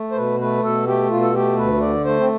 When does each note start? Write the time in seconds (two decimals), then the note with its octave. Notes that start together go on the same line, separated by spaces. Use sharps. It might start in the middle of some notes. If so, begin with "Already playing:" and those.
Already playing: A3
0.11 C5
0.16 B2 B4
0.40 A3 B4
0.63 B2 A4
0.87 A3 G4
1.10 B2 F4
1.22 A4
1.34 A3 G4
1.57 D2 B4
1.81 D3 D5
2.04 A3 C5
2.20 C4